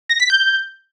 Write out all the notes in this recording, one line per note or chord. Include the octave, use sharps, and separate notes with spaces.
A#6
B6
G6